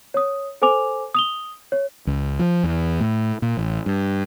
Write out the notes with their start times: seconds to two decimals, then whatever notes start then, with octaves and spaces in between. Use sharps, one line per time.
0.14 C#5 D#6
0.62 A4 C5 G#5 D6 F7
1.14 D#6 F7 G7
1.72 C#5
2.07 C#2
2.39 F3
2.63 E2
3.00 A2
3.42 A#2
3.57 A1
3.86 G2